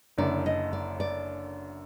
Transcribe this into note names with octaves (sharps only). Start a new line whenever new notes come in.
F#1 F#2 D3 D5
D#5
D5
D5